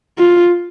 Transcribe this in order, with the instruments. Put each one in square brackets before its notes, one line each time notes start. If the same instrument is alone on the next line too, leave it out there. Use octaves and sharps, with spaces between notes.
[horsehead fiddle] F4